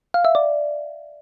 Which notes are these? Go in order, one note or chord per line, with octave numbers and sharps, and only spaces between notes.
F5
E5
D5